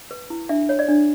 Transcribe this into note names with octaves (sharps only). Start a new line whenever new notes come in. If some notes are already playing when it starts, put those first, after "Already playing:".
B4
E4
D4 E5
C#5
D5
D4